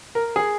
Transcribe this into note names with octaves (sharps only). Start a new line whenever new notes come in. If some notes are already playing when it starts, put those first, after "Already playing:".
A#4
G#4